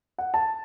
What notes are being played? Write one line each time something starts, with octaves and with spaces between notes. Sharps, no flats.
F#5
A5